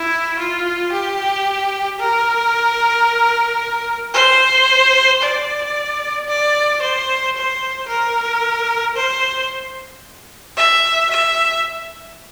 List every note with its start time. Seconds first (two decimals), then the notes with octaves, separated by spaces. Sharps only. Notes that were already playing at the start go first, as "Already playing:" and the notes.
Already playing: E4
0.39 F4
0.93 G4
2.00 A#4
4.15 C5
5.22 D5
6.28 D5
6.82 C5
7.36 C5
7.89 A#4
8.96 C5
10.57 E5
11.11 E5